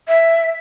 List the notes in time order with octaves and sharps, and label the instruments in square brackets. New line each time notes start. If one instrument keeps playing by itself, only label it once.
[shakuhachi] E5